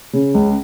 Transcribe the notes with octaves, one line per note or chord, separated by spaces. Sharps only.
C#3
C#2